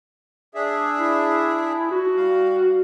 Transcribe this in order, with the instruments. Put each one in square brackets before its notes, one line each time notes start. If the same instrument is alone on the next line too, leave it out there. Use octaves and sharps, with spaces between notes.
[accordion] D4 G#4 E5
[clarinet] E4
F#4
[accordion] G3 F5